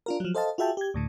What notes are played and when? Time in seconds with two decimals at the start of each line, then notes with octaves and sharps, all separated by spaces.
0.06 D4 F4 A#4
0.20 F3 F#3
0.34 A4 C5 D#5 F5 A5
0.58 F4 F#4 G#4 E5 G5 A5
0.77 G4 G#6
0.94 D2 A2 D3